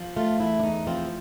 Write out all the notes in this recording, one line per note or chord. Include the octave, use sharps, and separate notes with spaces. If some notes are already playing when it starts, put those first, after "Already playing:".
Already playing: F3
A3 F4
E2 E4
D4
E2 D#4
F3 C4